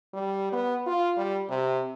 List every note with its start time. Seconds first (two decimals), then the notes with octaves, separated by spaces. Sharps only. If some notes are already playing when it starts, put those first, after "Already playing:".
0.13 G3
0.52 B3
0.86 F4
1.17 G3
1.50 C3